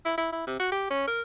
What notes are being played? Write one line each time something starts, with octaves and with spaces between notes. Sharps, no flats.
E4
E4
E4
C3
F#4
G4
C#4
A#4